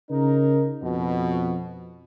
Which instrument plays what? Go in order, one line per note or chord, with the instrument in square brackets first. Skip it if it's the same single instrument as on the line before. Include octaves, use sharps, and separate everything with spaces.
[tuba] C#3 [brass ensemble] D#4 A#4
[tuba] F2 [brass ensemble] B2